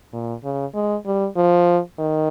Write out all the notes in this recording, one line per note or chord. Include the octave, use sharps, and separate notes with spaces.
A#2
C#3
G#3
G3
F3
D#3